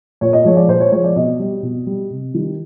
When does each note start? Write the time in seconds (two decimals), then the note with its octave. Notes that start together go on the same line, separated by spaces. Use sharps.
0.21 A#2 C#5
0.33 D#5
0.45 F3 G#3 C#5
0.57 D5
0.68 A#2 C5
0.80 C#5
0.92 F3 G#3 C#5
1.04 D5
1.16 B2 D#5
1.39 G3
1.63 B2
1.87 G3
2.10 C3
2.34 D#3 G3